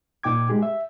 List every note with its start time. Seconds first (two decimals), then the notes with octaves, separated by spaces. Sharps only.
0.23 A#2 D#4 G5 D6 G#6
0.49 G#3 G4 G#4
0.63 E5